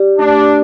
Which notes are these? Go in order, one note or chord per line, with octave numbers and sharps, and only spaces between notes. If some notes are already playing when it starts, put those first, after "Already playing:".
Already playing: G4 D5
A3 D4